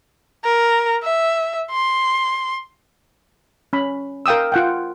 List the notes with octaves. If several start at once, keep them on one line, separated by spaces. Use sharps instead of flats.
A#4
E5
C6
C#4 B5
A#4 F5 G5 D#6 E6
F4 F#5 G5